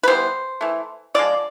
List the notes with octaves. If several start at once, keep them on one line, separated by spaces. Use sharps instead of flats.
B4
E3 G3 B3 C5
E3 A3
D3 F3 G#3 D5